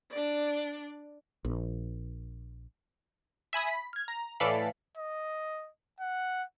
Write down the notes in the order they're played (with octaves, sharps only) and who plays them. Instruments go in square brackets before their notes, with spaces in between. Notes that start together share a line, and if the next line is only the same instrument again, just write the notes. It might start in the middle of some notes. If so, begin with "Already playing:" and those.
[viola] D4 D5
[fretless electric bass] A#1
[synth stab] E5 G#5 B5 D#6
B5
F6 G#6
A#5
A2 E3 A4 D5 F5 B6
[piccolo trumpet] D#5
F#5